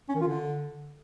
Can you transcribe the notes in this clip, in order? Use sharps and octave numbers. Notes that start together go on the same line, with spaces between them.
C#4
D#3
F4
D3